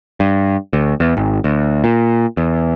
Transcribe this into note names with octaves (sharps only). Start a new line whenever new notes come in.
G2
D2
E2
G#1
D2
A#2
E2